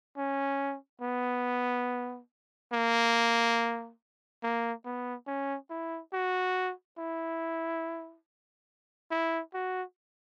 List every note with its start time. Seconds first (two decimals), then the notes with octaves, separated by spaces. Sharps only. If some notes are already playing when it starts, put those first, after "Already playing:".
0.17 C#4
1.01 B3
2.73 A#3
4.43 A#3
4.85 B3
5.27 C#4
5.70 E4
6.13 F#4
6.98 E4
9.11 E4
9.54 F#4